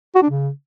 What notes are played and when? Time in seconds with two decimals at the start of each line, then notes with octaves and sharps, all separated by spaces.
0.15 F#4
0.22 D4
0.30 C#3